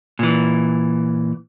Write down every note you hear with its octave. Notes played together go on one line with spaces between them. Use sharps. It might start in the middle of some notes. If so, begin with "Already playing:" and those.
A#2 E3